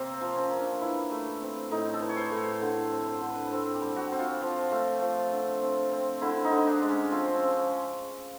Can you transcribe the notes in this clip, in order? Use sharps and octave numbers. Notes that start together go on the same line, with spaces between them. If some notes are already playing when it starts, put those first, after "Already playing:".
Already playing: C3 A#3 C4
F3
C#4
A#3
D4
E3 E4
A3
C4
A2 D#4
A4
E3
C#5
C5
A2
D3
C4
C5
D3
B4
C4 A4
G4
G3
F#4
C4
F4
F3
A3
F3
D3
C4
C4
D3 E4
D#4
D3
D4
G#3
C#4
F3 C4
C#4
F3
C#4